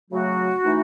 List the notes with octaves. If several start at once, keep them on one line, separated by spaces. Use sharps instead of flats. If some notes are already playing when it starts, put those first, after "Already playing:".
C#3 F#3 A3 F#4
E3 A3 D#4